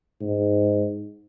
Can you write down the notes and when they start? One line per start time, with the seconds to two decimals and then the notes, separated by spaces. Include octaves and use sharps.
0.21 G#2